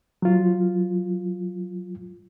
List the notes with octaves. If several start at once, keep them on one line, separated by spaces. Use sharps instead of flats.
F#3 F4